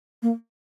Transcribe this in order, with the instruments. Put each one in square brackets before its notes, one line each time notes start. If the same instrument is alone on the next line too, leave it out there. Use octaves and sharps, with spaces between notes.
[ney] A#3